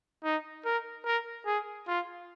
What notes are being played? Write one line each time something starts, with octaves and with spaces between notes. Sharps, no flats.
D#4
A#4
A#4
G#4
F4